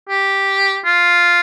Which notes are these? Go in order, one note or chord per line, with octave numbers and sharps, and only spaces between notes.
G4
F4